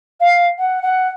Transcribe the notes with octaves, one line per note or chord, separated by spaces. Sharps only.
F5
F#5
F#5